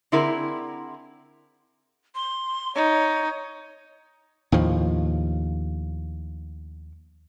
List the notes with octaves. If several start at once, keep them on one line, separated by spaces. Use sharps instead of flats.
D3 C4 E4 G#4 A#4
C6
D#4 C#5
D#2 A2 F3